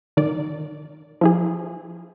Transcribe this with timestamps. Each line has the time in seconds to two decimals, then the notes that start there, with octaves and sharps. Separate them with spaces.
0.17 D#3 D5
1.21 F3 E4 G#4